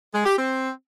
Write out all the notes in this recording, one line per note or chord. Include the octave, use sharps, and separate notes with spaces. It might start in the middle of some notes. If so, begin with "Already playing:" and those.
G#3
G4
C4